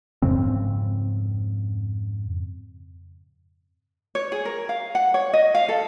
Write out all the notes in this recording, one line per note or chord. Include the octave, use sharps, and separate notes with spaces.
F2 G#2 C#3 C4
C#5
G#4
A#4
F5
F#5
C#5
D#5
F5
A4